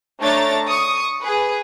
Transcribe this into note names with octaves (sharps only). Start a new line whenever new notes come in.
A3 D4 C#5 A#5 A6
C#6 D#6
G#4 B4